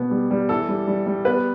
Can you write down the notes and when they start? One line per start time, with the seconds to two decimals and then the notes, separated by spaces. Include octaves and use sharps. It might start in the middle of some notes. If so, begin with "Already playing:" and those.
Already playing: B2 B3
0.11 G3
0.31 G3
0.49 E3 A4
0.69 G3
0.87 G3
1.07 G3
1.25 B3 B4